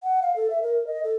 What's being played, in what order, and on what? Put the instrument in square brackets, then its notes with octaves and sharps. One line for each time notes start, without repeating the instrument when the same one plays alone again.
[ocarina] F#5
F5
A4
E5
A#4
D#5
A4